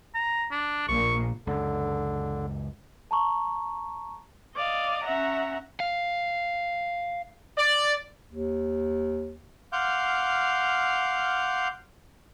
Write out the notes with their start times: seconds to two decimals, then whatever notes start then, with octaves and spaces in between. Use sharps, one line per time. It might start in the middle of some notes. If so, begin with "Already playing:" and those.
0.15 A#5
0.52 D4
0.88 A#1 A#2 C#6
1.47 C#2 F#2 D3
3.11 A5 A#5 C#6
4.54 D5 D#5 F5
5.03 C#4 E5 F#5 A#5
5.80 F5
7.58 D5
8.31 D#2
9.73 F5 F#5 C6 D6 F6 G6